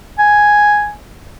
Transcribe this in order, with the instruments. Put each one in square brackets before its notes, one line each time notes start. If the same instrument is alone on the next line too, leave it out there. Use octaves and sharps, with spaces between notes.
[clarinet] G#5